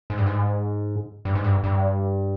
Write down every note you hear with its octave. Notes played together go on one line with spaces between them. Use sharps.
G#2
G2
G#2
G2
G#2
G2
G2